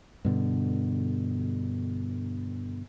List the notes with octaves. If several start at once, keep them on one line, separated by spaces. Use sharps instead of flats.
G2 B2 D3